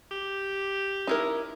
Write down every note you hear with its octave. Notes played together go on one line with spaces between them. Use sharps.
G4
D#4 E4 A#4